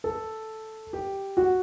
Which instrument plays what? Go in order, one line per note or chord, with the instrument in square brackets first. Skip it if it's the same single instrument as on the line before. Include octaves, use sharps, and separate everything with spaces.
[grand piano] A4
G4
F#4